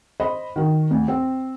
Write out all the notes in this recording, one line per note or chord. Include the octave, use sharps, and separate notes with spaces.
C5 D#5 B5
D#3 F#4
D2
C4